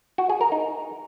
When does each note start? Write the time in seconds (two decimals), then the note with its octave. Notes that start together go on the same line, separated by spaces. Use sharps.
0.18 F#4
0.29 G#4
0.41 A#4
0.52 D#4